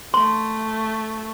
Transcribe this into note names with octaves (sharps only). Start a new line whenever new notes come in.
A3 C6